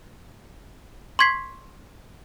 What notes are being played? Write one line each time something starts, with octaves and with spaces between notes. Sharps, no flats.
C6 C#6 G#6 B6 C7